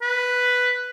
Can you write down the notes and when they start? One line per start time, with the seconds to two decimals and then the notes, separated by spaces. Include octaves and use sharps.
0.02 B4